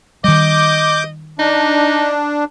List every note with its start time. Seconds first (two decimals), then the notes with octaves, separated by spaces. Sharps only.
0.24 D#3 G3 D#5 D6 G6
1.39 D4 D#4